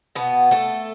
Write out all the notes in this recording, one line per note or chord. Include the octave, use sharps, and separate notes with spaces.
B2 B3
A3 A4